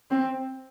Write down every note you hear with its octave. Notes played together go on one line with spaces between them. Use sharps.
C4